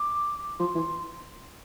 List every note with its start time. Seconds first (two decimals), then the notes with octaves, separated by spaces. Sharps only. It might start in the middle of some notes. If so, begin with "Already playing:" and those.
Already playing: D6
0.60 F3 C6
0.75 E3